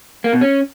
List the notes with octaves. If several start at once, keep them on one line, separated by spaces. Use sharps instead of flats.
A#3
B2
C#4